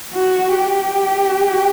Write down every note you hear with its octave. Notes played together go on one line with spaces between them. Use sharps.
F#4
G4